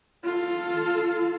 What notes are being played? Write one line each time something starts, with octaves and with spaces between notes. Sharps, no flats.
F4 A4